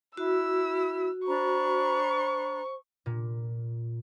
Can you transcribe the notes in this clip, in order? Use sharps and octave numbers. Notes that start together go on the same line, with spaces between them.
E4 F#4 E6
D4 C5 A#5 B5 C#6
A#2